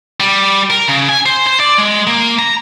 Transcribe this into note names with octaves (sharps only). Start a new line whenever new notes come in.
G3
A#4
C#3
G#5
C5
C5
D5
G#3
A#3
A#5